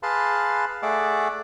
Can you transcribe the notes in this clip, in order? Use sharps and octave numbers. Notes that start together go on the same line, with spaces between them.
G#4 B4 F5 A5 B5 C6
A3 G#4 D5 E5 F#5 D6